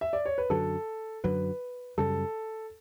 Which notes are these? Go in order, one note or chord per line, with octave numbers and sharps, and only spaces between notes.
E5
D5
C#5
B4
F#2 D3 F#3 A4
F#2 D3 F#3 B4
F#2 C#3 G3 A4